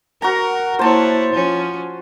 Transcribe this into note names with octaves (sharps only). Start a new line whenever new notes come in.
F#4 A#4 A#5
A#3 E4 C5 C#5 A5
F3 C#4